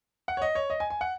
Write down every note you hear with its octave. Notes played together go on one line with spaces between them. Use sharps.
F#5
C#5
D#5
C#5
D#5
G#5
G#5
F#5